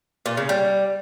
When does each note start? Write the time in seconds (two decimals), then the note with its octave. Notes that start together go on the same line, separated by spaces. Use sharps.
0.26 A#2
0.37 C#3
0.49 G3